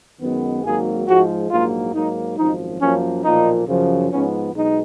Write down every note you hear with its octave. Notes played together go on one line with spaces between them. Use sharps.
F#2 D#3 G#3 B3
G#1 G#2 F#3 A#3 G#4
G#2 F3 G#3 F#4
A#1 G#2 F#3 A#3 F4
G#2 F#3 A#3 D#4
G#1 F#2 F3 D#4
F#2 F3 A#3 C#4
B1 A#2 F3 A#3 D#4
F#2 C#3 F3
G#2 F3 B3 C#4
B1 B2 G#3 D#4